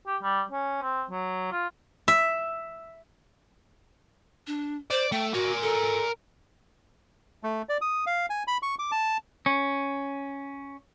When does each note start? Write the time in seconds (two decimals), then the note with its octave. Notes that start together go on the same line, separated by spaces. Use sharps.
0.07 G4
0.23 G3
0.52 C#4
0.82 C4
1.10 F#3
1.52 F4
2.08 E5
4.47 D4
4.91 C5 D5
5.12 A3 G5
5.34 F#4 A#4 G#5
5.62 A4
7.43 A3
7.69 D5
7.81 D#6
8.07 F5
8.30 G#5
8.48 B5
8.63 C#6
8.79 D6
8.92 A5
9.46 C#4